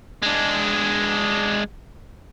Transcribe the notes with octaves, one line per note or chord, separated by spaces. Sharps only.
G#3 D4